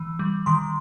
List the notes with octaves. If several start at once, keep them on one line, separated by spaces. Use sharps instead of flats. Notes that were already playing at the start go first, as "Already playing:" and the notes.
Already playing: E3
G3
D#3 C6